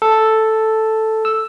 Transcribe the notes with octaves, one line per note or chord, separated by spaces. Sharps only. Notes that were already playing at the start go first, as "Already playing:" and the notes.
A4
E6